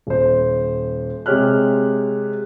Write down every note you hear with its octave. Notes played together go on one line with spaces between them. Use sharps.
D#1 C5
C3 G#3 G4 C#5 F6 F#6